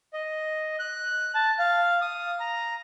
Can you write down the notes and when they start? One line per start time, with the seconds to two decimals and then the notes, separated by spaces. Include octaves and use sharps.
0.13 D#5
0.79 F#6
1.35 A5
1.59 F5
2.01 D#6
2.40 A#5